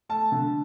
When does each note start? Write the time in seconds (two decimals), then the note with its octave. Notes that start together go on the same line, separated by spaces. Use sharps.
0.09 A3 A5
0.32 D3